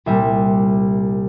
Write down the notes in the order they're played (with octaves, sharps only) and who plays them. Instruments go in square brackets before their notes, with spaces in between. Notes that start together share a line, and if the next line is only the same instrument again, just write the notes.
[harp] C2 A#2 G3 E5